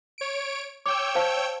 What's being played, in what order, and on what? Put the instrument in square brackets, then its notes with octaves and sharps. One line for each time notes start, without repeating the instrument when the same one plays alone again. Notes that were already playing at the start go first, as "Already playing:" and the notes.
[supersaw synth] C#5 D7
[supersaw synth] C#5 G5 E6 [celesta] D6
[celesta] C5 F5 A5